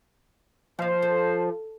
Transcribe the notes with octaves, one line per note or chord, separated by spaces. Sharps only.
D#2 F3 C5 F5
A4